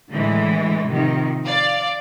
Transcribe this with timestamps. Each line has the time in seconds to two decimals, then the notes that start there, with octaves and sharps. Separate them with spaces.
0.11 A2 D3 E3 G#3
0.87 C3 D#3 F3
1.46 D5 F5